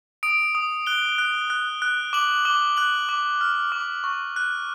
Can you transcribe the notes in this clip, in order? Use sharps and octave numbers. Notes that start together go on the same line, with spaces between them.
D#6 D7
D#6
F#6 G7
F#6
F#6
F#6
D6 F#7
D6 G7
F#6 F#7
D6
F6
D6
C#6
F#6